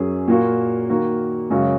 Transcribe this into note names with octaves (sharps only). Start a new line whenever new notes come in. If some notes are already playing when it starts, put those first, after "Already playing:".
Already playing: F#2 F#3 C#4 G#4
A#2 A#3 F#4
D#3 A#3 F#4
F#2 C#3 G#3 F#4